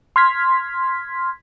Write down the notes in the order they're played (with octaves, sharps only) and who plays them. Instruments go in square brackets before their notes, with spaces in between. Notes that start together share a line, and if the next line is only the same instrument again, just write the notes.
[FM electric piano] C6 F6 G#6 B6